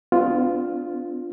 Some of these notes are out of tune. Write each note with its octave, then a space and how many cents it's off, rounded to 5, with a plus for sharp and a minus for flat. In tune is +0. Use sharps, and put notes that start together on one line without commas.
B3 +45 D4 +0 F4 +0